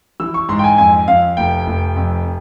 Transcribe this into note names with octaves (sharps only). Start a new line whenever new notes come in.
E3 E6
C#6
G#2 C6
G5
G#5
F2 G#5
F2 F5
F1 G5
F1
F2